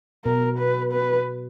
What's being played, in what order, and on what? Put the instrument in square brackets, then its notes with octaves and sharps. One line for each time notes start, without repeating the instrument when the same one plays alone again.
[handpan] B2 [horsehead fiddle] A#4
[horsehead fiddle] B4
B4